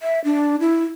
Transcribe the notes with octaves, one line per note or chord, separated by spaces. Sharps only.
E5
D4
E4